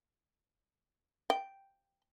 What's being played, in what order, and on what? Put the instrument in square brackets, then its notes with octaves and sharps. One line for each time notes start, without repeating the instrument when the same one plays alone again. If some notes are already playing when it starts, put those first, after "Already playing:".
[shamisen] G5